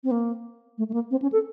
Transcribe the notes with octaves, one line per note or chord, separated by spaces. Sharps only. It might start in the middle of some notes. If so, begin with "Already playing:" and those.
C4
A#3
A3
A3
A#3
C4
C#4
A4